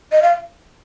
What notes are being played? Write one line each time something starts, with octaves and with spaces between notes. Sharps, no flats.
D#5
F5